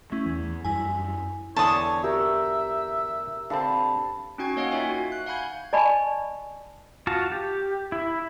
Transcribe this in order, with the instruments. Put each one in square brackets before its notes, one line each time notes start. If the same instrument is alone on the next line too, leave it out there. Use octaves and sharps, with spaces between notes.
[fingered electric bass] A3 [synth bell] C#4 E4
[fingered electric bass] E2 E3
[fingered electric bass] F#2 G3 [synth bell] E4 G#5
[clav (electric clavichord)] E2 D3 E3 [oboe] C#5 [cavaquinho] A5 D#6
[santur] G4 A#4 F#5 [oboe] E5
[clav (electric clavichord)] D3 C4 [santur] F5 A5 B5
[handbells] C#4 D#4 F#4 G5 C#6 G#6
A#3 C#5 D#5 F5 F#5
D#4 F4 C#5 E5 G#5
F#4
F#6
F5 F#5 G#5 B5 G6 G#6
[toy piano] D5 D#5 G#5 A5 B5 C#6
[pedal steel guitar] F4 F#4 A5
G4
E4